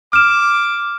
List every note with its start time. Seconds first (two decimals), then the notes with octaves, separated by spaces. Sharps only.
0.13 D6 F6 E7